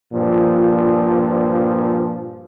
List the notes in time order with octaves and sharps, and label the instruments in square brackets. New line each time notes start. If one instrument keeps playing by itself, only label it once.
[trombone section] G2 A#2 F3